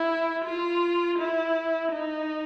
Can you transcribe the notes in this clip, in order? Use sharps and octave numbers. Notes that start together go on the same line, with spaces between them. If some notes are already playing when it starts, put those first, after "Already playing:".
Already playing: E4
F4
E4
D#4